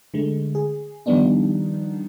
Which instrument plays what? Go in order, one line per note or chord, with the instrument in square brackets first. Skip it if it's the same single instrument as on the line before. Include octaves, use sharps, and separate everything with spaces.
[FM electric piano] D3 G#3 A3
G#4
D#3 F3 G3 B3 D4 D#4